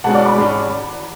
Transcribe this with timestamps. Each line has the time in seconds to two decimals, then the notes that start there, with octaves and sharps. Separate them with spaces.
0.04 B2 G#3 C#4 F#5 A5
0.14 D5 F#5
0.25 B5 D6
0.36 G#2 G#3 C#4